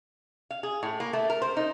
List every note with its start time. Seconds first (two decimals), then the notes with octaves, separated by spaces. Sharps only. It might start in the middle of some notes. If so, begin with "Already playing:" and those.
0.51 F5
0.63 G#4
0.83 A2
1.00 A#3
1.13 A3
1.30 A#4
1.42 C5
1.57 D#4